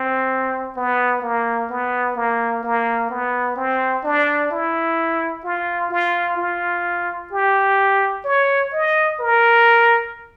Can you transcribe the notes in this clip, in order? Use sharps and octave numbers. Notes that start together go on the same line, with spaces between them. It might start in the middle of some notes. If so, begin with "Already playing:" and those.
Already playing: C4
B3
A#3
B3
A#3
A#3
B3
C4
D4
E4
F4
F4
F4
G4
C#5
D#5
A#4